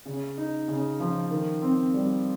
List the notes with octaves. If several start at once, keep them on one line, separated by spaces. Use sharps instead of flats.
C#3
D#4
C#3
F3
D#3
C4
G3